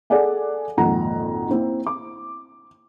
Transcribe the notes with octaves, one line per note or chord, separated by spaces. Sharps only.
G#4 A4 D5 F#5 G#5
G#1 F2 A#2 F#5 A#5
A#3 C4 E4
D6